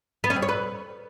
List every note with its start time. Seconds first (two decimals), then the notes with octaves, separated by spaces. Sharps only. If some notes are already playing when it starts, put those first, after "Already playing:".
0.24 B3
0.30 C#4
0.36 C4
0.42 C#5
0.49 B4